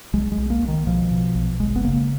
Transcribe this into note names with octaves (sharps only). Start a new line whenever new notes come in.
B1 G#3
G#3
B1
A#3
B1
D#3
B2 F3
B2
B1
F#1 G#3
B3
C#3 A#3